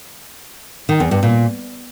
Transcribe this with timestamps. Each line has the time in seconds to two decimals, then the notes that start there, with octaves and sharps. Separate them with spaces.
0.89 D#3
1.00 E2
1.11 G2
1.23 A#2